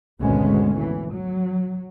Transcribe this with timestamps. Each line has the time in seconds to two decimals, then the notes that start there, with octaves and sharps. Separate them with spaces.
0.20 G#1 D2 B2 G#3 B3 C#4
0.78 E3
1.13 F#3